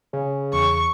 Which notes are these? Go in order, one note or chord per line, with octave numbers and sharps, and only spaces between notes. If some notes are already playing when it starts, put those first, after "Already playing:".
C#3
E2 C#6